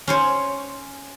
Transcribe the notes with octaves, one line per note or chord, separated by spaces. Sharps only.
C#4 C5 C#5